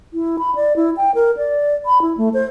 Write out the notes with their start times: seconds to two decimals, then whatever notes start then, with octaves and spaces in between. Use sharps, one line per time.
0.14 E4
0.39 B5
0.55 D5
0.76 E4
0.97 G5
1.15 A#4
1.37 D5
1.86 B5
2.02 E4
2.18 A3
2.34 C5